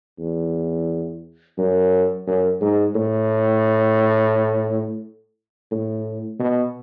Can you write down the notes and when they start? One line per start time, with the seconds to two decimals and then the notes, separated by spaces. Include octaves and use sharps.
0.19 E2
1.58 F#2
2.27 F#2
2.61 G#2
2.95 A2
5.71 A2
6.40 B2